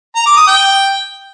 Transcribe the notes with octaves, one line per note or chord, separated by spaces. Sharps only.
A#5
D6
D#6
G5